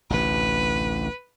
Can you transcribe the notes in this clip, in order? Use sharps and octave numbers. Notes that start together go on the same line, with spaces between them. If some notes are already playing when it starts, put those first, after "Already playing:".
A1 D2 C3 B4